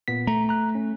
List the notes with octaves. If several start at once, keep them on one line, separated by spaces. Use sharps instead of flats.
A#2 B3 B6
A3 A#5
A#5 F#6
C#4